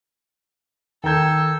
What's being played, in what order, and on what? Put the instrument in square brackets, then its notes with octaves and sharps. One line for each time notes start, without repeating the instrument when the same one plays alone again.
[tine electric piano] D#3 G#6 [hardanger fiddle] A4 [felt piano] G5 A#5 G6